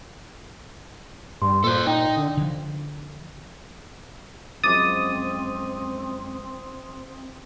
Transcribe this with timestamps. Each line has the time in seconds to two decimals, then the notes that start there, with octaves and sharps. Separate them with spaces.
1.42 G2 A5 C6
1.64 A#2 A4 C5
1.87 D#4 G5
2.17 D3
2.37 D3 F3
4.64 F#2 F3 G#3 C4 D6 D#6 A6